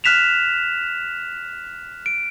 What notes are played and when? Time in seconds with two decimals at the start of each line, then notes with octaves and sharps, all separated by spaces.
0.04 F6 F#6 B6 E7 F7
2.06 D7